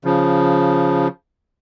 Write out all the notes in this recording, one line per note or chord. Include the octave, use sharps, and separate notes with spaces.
C#3 F3